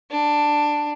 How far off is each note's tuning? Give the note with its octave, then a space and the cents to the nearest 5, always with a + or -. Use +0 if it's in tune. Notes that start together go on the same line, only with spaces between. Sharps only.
D4 +10